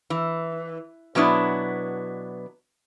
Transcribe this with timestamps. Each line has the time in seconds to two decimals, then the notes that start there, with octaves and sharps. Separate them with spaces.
0.10 E3
1.15 B2 F#3 B3 D4 E4